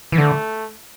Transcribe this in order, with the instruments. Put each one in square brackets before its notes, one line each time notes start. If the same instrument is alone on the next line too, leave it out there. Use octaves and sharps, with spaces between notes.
[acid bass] E3
[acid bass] D3 [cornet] A3